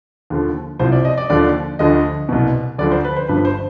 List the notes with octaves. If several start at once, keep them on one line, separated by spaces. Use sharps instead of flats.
D#2 D3 F3
C2 C3 F3 C5
D5
D#5
D5
D#2 D3 F3 D5
D2 D3 F3 D#5
C2 B2
D2 D3 F3 D5
C5
B4
C5
G1 G2 F3 B4
C5